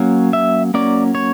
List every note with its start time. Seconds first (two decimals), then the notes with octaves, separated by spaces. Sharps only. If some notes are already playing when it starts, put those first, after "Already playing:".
Already playing: F#3 A#3 C#4
0.33 E5
0.74 F#3 A#3 C#4 D5
1.15 C#5